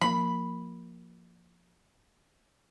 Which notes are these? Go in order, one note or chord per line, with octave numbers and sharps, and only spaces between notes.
F3 A#3 B5